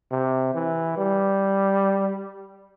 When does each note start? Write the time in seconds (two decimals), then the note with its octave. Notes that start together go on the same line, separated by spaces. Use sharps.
0.12 C3
0.55 E3
0.97 G3